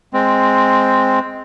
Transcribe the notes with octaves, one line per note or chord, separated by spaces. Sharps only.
G#3 C4